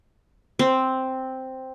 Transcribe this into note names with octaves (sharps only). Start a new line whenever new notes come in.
C4